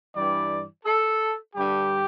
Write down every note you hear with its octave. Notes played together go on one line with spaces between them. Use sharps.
G2 E3 G3 D5
A4
G2 D3 G3 G4